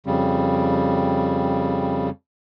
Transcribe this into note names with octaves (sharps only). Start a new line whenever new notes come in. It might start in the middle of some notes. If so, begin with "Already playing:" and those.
F2 C#3 G3